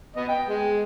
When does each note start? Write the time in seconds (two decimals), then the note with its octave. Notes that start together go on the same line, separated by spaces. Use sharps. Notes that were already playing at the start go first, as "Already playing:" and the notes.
0.16 B3 D#5
0.29 G5
0.49 G#3